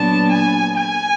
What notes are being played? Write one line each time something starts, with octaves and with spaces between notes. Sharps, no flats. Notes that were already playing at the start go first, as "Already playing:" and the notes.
Already playing: A#2 F#3 B3 D4 A5
G#5
G#5